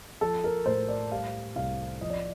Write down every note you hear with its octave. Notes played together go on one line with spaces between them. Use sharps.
F3 A4
A#4
A2 C5
D5
G3 F5
C2 F5
F3 D#5
D5